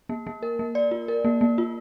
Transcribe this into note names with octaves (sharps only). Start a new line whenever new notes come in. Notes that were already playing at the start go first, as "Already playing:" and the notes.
A#3
A#3
A#4
A#3
D5
F4
A#4
A#3
A#3
F4